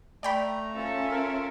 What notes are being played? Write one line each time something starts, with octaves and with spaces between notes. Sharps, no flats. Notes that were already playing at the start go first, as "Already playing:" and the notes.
A3 D5 G5 A#5 B5
C#4 F4 A4 E5
A#4